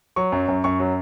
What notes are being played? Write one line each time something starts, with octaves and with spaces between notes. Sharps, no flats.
F#3 C#6
F#2
F#2
F#2 C#6
F#3